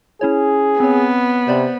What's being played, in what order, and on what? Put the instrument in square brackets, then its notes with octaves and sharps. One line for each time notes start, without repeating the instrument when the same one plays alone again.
[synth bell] C#4 E4 C#5 [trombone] G#4
[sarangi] B3 [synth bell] C4 C#5
[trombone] C3 [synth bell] C5 D5 B5